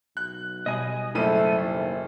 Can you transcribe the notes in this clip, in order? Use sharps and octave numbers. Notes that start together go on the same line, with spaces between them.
B1 F#6
B2 G3 D#5 G#5 D#6
F#1 A3 E4 A4 C5 D#7
D#2